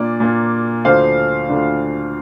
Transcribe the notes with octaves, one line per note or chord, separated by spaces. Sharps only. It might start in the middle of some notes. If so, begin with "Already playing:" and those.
Already playing: A#2 A#3 D4 D5
A#2 A#3 D4
D2 D3 F3 D4 C5 F5
D2 D3 F3 D4